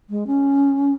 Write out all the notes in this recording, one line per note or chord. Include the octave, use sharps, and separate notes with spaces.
G#3
C#4